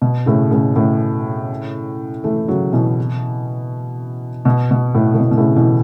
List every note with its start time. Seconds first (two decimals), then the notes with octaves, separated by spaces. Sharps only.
0.02 B2
0.26 A2 C#3
0.51 A2 C#3
0.76 A2 C#3
2.24 E3 A3
2.48 C#3 F#3
2.73 B2 E3
4.45 B2
4.71 B2
4.95 A2
5.14 A2
5.20 B2
5.31 B2
5.38 A2 C#3
5.56 B2 E3